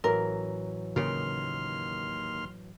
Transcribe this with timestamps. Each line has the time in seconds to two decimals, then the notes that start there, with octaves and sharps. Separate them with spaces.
0.04 A1 E3 F#3 A#4
0.96 D#2 A#2 C#3 C6 F6